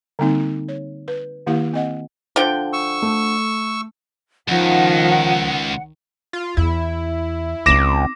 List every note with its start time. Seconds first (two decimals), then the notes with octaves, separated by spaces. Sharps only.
0.19 D3 G3 A#3 C4 D#4
0.68 C#5
1.08 B4
1.47 D#3 A#3 E4 G4 F5
1.74 C4 D#5 F#5
2.36 D3 F3 G5
2.73 C#6 E6
3.02 A3
4.48 C#2 D#3 F3 F#5
6.33 F4
6.57 E2 E4
7.66 C#2 C4 D#4 D6 A#6 E7